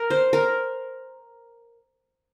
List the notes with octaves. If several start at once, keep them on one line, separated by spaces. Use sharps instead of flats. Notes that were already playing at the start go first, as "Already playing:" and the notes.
Already playing: A#4
C5
A#4